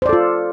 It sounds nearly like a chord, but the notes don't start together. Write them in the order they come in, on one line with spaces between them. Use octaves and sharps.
C5 D5 A4 F4